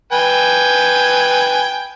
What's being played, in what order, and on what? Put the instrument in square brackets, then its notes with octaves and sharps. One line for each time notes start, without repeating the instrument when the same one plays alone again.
[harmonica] B4 G5 G#5